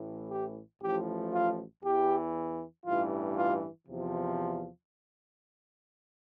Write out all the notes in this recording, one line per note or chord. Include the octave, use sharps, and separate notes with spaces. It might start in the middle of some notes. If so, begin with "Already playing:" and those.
Already playing: A1 A2 E3
G4
A1 A2 F3 G4
F4
E2 E3 G4
A1 G2 E3 F4
F4
E2 C3 F3